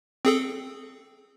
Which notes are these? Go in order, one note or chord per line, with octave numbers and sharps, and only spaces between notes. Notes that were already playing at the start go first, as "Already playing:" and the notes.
C4 G#4 A4